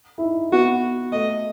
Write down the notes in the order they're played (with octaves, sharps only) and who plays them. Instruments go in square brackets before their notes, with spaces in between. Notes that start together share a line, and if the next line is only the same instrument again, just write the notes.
[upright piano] E4
D#4
[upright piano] B3 [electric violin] F#4
[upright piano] A3 [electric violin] D#5